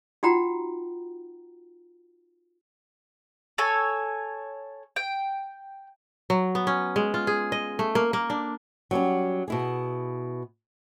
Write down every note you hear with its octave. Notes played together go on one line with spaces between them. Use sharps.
D#4 F4 F#4 F#5 G5 A#5
A4 C#5 G#5
G5
F#3
B3
C#4
G#3
F4
G#4
D#5
A3
A#3
A#3
D4
F#3 G3 C#4
B2 E4 G#4